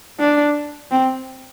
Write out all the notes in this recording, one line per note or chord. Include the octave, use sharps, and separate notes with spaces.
D4
C4